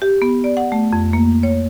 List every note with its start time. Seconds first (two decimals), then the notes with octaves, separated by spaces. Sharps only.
0.02 G4
0.22 B3
0.44 D5
0.57 F#5
0.72 A3
0.93 F2
1.13 A#3
1.43 C#5